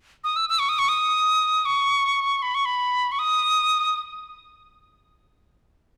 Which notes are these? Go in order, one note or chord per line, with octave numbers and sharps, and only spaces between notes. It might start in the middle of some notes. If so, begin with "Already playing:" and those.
D#6
E6
E6
C#6
D#6
C#6
D#6
C#6
B5
C#6
B5
C#6
D#6